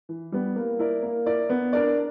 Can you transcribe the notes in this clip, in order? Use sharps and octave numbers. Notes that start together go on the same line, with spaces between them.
E3
G3 B3
A#3
E4 A#4 D5
A#3
E4 A#4 D5
B3
D4 A#4 D5